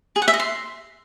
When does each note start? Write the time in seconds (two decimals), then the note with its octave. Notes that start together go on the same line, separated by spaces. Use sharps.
0.16 G#4
0.22 F#5
0.28 E5
0.34 D#5
0.40 C6